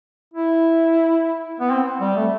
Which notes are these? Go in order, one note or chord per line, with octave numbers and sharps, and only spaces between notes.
E4
B3
C4
G3
A3